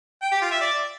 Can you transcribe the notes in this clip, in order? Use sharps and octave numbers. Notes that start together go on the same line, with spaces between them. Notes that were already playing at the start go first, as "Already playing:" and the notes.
G5
G4
F4
E5
D5